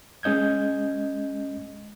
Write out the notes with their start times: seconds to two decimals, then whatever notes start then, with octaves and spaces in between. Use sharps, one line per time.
0.23 G#3 C#4 D#5 G6 G#6